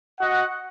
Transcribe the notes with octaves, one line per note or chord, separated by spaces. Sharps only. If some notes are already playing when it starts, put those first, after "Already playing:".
F#4 D#5 F#5